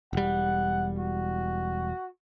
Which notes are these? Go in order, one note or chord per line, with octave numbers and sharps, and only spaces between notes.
E1 G3 F#5
F#4